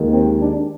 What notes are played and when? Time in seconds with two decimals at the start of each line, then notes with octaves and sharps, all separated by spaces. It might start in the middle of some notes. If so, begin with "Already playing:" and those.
Already playing: D#2 D#3 G#3
0.11 C4
0.41 D4